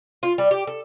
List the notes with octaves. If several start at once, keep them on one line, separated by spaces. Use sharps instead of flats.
F4
G3
G4
A4